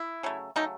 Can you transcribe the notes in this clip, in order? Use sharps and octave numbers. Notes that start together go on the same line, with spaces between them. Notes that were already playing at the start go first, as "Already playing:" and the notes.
Already playing: E4
C#3 F#3 A3
C#3 F#3 A3 D#4